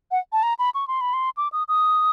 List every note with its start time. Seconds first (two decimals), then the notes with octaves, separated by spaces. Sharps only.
0.11 F#5
0.33 A5
0.43 A#5
0.59 B5
0.75 C#6
0.88 C6
1.01 B5
1.13 C6
1.37 D6
1.52 D#6
1.68 D#6